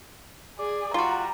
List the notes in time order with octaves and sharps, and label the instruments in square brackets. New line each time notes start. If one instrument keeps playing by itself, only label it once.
[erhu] G#4 [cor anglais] D5
[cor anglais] G3 [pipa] F4 F#4 [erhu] A#5